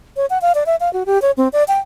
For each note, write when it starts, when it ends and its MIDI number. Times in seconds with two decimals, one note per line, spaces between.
0.17 0.26 73
0.30 0.38 78
0.42 0.52 77
0.55 0.64 74
0.66 0.76 76
0.80 0.92 77
0.93 1.03 66
1.06 1.21 67
1.22 1.31 73
1.37 1.48 60
1.53 1.64 74
1.68 1.79 79